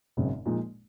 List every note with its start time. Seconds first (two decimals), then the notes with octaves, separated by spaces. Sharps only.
0.17 G#1 F#2 C#3 G#3 C4
0.46 A#2 F3 G#3 D#4